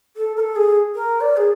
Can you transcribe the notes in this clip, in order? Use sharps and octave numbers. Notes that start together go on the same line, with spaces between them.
A4
A#4
A4
G#4
A#4
D5
G#4